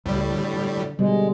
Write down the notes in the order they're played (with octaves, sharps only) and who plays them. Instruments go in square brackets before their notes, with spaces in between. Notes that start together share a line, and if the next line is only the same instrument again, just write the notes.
[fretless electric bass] C#2 [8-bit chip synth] A2 G3
[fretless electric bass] D3
[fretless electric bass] B2 D3 [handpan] G3 [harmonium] G#3